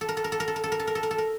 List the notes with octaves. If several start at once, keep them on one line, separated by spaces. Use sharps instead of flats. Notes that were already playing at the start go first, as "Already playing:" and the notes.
A4
A#4
A4
A#4
A4
A#4
A4
A#4
A4
A#4
A4
A#4
A4
A#4
A4
A#4